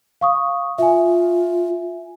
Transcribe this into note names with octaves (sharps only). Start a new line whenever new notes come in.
F5 C#6 D#6
F4 E5 G#5